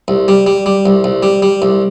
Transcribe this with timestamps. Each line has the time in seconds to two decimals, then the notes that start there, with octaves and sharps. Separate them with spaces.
0.08 C2
0.28 G3
0.46 G3
0.66 G3
0.86 C2
1.04 C2
1.23 G3
1.42 G3
1.62 C2